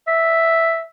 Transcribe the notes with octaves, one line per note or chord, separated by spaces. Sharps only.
E5